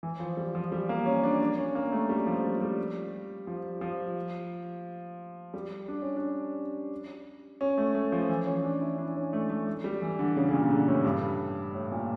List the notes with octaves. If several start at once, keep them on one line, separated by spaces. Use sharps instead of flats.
E3
F3
G3
F3
G3
A#3
C#4
D4
D4
C#4
A#3
A3
G3
F3
G3
G3
F3
F3
G3
D4
C#4
D4
C#4
A3
A3
F3
E3
C#4
D4
E4
D4
C#4
A3
A3
A3
G3
E3
D3
C#3
C#3
A#2
D3
A2
G2
A2
A#2